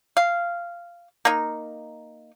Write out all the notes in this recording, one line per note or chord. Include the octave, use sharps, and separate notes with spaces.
F5
A#3 D#4